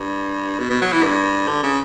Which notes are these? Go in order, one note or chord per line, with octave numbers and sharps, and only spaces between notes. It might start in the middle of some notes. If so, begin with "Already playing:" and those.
Already playing: G2
B2
B2
F#3
E3
G2
D3
C#3